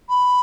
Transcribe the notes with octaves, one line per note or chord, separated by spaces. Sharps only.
B5